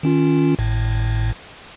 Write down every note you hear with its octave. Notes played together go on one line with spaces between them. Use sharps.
D#3 C#4 F4
G#1 A2